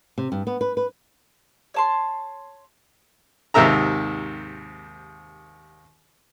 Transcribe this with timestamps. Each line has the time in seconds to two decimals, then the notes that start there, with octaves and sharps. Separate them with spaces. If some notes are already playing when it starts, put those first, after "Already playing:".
0.18 C3
0.32 G2
0.47 B3
0.61 B4
0.77 B4
1.74 C#5 A5 C6
3.54 D#2 G#2 C3 A#4 E5 A#5